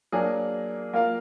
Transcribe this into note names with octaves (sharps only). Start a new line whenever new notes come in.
F#3 A#3 D4 G#4
A#3 F4 A#4 F5